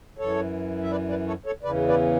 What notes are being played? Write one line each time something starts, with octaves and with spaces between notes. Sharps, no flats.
F#2 E3 A4 C#5
E5
B4 D5
B4 D5
A4 C#5
A4 C#5
E2 C#3 E3 B4 D5
B4 D5